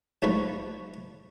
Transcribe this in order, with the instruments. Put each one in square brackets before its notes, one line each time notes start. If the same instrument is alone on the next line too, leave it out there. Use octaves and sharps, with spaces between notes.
[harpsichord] B1 G#2 F3 A3 B4 C#5